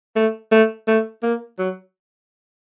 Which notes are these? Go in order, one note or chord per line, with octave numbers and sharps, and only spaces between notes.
A3
A3
A3
A#3
F#3